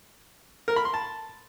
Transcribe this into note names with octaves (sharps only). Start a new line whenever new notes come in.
A#4
B5
C6
A5